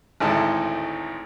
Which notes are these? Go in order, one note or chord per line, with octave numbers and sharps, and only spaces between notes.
G#1 D2 A2 D#4 A5